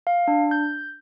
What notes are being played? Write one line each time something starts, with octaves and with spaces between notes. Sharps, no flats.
F5
D4
G6